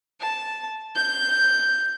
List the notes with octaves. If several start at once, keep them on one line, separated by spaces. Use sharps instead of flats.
A5
G6